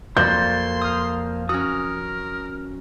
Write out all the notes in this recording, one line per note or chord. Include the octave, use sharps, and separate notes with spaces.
F2 A#3 F#4 C5 D5 B5 C6 G6
D#6 F6
C#4 F#4 A#4 D#6